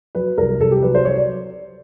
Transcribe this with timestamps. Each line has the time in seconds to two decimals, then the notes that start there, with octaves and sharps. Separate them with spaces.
0.15 F#3 B4
0.37 C2 A#4
0.60 C2 A4
0.71 G4
0.82 F#3 B4
0.95 C5
1.05 F#3 C#5
1.16 D5